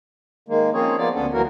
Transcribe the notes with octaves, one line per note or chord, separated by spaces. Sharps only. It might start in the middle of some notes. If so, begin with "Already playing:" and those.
D#3 G#3 A#3
F3 A#3 C4 C#4 G#4 C#5
F3 A#3 B3 F4 D5
D2 B3 C#4 D4 A4
D2 E3 F#3 A#3 F#4 A#4